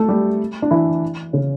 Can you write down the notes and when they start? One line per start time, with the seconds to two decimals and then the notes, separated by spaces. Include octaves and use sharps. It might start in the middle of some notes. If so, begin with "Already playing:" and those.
Already playing: A3 A4
0.08 G3 G4
0.62 D4
0.71 E3 E4
1.33 C#3 C#4